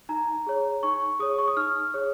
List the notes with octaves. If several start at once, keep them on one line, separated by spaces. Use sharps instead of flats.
D#4 A#5
G#4 C#5
D#4 C#6
G#4 C#5 D#6
C#6
D#6
D#4 F6
G#4 C#5